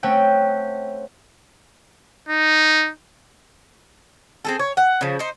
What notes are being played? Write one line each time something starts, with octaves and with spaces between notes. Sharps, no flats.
A3 C4 C#4 F#5 G5
D#4
C4 G#4 A4
C#5
F#5
C#3 F3
D#4 C5